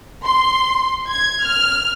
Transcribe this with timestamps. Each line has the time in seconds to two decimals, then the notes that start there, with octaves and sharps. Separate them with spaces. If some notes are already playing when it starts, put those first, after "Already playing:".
0.24 C6
1.08 G#6
1.45 F6